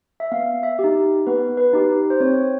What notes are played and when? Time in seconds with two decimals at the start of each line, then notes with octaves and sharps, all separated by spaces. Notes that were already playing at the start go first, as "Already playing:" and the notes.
0.20 E5
0.32 B3 F5
0.63 E5
0.79 G4
0.84 D#4
1.27 B3 B4
1.57 B4
1.73 D#4 G4
2.10 C5
2.20 C4 C#5